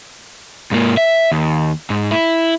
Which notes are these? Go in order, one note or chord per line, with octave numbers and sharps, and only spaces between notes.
G#2 A#3
E5
D#2
G#2
E4